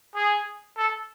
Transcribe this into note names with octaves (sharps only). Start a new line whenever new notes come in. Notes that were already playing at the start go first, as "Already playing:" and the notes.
G#4
A4